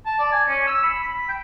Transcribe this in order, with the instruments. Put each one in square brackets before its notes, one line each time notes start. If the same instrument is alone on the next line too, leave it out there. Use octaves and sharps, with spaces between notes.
[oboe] A5
D5
G#5
C#4
E6
B5
B5
G5